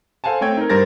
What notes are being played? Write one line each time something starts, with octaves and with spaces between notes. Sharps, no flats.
A4 C5 F5 F#5 G#5 A5
A3 C4 C#5 G5 G#6
D#4 A#4
G2 G3 A#4 C5 A6 A#6